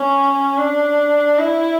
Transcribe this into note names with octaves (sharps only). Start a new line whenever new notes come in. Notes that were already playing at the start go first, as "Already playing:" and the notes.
Already playing: C#4
D4
E4